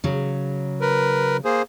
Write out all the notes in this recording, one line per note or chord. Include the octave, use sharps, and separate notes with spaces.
C#3 F#3
A#4 B4
A#3 G#4 C5